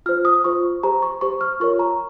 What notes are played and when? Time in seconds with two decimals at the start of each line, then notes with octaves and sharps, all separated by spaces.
0.06 F4 C5 F6
0.25 D#6
0.44 F4 C5 C#6
0.83 G4 C5 A#5
1.02 C#6
1.21 G4 C5 C#6
1.41 F6
1.60 F4 A#4 C#5 C#6
1.79 A#5